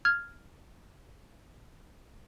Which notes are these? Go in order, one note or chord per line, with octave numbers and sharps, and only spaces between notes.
F6 G#6